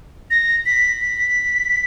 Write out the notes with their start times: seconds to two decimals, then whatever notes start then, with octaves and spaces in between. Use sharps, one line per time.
0.31 A#6
0.66 B6
1.01 B6